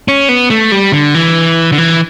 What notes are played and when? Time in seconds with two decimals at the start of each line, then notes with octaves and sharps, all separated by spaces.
0.08 C#4
0.29 B3
0.50 A3
0.72 G3
0.92 D3
1.15 E3
1.72 D3
1.78 E3